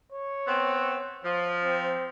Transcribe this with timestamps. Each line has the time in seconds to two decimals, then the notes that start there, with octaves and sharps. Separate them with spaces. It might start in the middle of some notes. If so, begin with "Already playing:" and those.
0.12 C#5
0.47 B3 C4
1.24 F3
1.64 C4